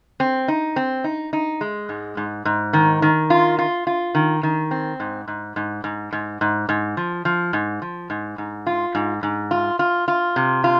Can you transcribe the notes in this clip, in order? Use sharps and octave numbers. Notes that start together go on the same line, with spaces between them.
C4
D#4
C4
D#4
D#4
G#3
G#2
G#2
G#2
D#3
D#3
F4
F4
F4
D#3
D#3
C4
G#2
G#2
G#2
G#2
G#2
G#2
G#2
F3
F3
G#2
F3
G#2
G#2
F4
G#2
G#2
F4
F4
F4
C3
F4